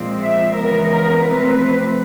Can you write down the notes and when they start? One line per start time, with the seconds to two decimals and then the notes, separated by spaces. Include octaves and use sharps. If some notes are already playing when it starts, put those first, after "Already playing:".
Already playing: A#2 F3 G#3 C4
0.23 E5
0.57 C#3 E3 G#3 B3 A#4
0.91 A#4
1.26 C3 F3 A3 C4 B4